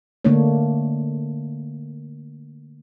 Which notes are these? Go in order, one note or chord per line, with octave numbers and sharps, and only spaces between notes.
D3 A3 A#3 D4 C#5